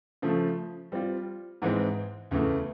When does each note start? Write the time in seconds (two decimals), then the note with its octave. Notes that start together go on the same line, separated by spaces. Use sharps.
0.22 C#3 F3 A3
0.92 G3 C4 F4
1.62 G#2 E3 G#3 C4
2.31 E2 C#3 E3 A3